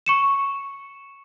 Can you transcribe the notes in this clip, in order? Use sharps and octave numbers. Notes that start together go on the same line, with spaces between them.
C#6 C#7 E7